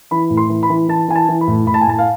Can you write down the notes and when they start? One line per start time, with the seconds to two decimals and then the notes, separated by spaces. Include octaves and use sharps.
0.11 E3 B5
0.30 A2
0.37 C6
0.49 E3
0.63 B5
0.70 E3
0.88 E3 A5
1.08 E3 G#5
1.15 A5
1.28 E3
1.41 B5
1.47 A2
1.66 A2 B5
1.74 A5
1.81 G#5
1.87 A2 A5
1.98 F5